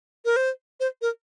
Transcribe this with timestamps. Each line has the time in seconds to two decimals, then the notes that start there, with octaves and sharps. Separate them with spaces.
0.25 A#4
0.36 C5
0.80 C5
1.02 A#4